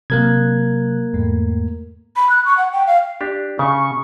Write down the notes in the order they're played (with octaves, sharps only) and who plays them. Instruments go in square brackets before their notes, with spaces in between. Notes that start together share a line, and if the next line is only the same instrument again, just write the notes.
[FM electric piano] C3 F#3 F#6 [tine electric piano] A#3 A#4 G#6
[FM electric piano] E2 G#2 A3
[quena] B5
F#6
C#6
F#5
G5
F5
[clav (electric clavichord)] D4 G4
[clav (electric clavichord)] C#3 [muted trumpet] C#6